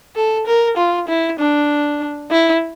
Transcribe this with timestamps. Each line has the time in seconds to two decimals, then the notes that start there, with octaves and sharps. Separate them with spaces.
0.16 A4
0.47 A#4
0.77 F4
1.08 E4
1.39 D4
2.31 E4